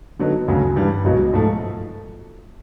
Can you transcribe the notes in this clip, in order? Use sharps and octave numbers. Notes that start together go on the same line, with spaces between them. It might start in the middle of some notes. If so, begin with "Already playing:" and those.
D3 F#3 B3 D#4
D2 C#3 F#3
G2 E3 G3
C#2 B2 F#3
G#2 F3 A3